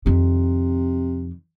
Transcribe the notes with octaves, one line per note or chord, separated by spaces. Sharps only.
F2 C3 D#3